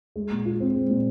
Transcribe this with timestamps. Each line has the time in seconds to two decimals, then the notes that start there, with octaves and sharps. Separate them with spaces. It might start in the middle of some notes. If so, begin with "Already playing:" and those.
0.16 G#3
0.31 A#2
0.45 F4
0.60 C4
0.75 G#3
0.90 A#2